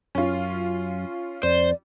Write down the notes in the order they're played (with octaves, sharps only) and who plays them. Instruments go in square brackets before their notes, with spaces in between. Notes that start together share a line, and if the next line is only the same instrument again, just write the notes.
[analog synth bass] F#2 [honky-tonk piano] C#4 F4
[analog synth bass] F2 [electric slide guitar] C5 [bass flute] D5